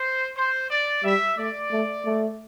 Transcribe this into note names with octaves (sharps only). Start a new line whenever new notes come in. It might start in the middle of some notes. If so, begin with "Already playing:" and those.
Already playing: C5
C5
D5
G3 E5
A3 D5
A3
A3